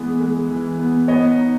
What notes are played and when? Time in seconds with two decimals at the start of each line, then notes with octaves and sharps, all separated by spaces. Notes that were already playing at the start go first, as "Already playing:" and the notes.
Already playing: E3 G#3 B3
0.20 G#3
0.50 E3
0.79 B3
1.08 B3 C#5 D#5
1.38 D#4